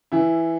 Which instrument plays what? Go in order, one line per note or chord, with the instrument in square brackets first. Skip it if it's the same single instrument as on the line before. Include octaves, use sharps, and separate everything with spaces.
[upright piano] E3 E4